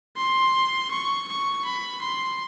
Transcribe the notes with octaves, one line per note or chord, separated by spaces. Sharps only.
C6
C#6
C#6
B5
C6